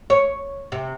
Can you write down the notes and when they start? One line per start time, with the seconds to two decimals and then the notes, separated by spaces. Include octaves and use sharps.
0.10 C#5
0.72 C3